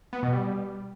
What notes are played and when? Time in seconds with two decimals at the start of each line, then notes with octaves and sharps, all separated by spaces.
0.13 B3
0.23 B2
0.32 G3